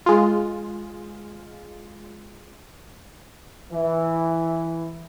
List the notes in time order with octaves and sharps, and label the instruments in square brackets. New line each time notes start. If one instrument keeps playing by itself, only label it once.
[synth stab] G#3 F4
[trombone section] E3